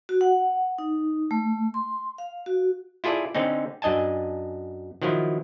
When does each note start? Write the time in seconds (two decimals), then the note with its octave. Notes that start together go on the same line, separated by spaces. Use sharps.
0.09 F#4
0.21 F#5
0.78 D#4
1.31 A3
1.74 C6
2.18 F5
2.46 F#4
3.04 E4 F4 G#4 A4 D5
3.35 D3 C4 C#4 D#4
3.82 F#2 D4 D#5 G#5 A5
5.02 D#3 F3 F#3 E4 F4